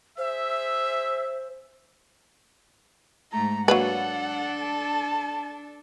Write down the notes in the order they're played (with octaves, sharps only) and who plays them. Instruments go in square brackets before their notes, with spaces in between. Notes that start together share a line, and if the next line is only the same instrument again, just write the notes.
[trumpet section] G#4 E5 [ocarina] C5
[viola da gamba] G#2 A3 [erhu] A#5
[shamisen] F#3 A#3 B4 [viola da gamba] D4 A4 [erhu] F#5
[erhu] A5